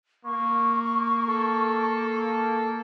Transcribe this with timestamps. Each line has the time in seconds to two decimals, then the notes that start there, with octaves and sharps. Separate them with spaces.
0.25 A#3 C#6
1.27 A4